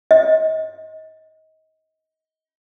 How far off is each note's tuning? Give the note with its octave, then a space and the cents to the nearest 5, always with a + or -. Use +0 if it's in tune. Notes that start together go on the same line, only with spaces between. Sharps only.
D#5 +25